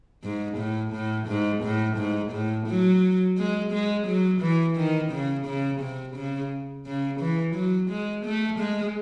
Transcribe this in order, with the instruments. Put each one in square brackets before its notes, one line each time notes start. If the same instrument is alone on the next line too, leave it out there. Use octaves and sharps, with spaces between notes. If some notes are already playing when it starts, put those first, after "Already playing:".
[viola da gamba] G#2
A2
A2
G#2
A2
G#2
A2
F#3
G#3
G#3
F#3
E3
D#3
C#3
C#3
C3
C#3
C#3
E3
F#3
G#3
A3
G#3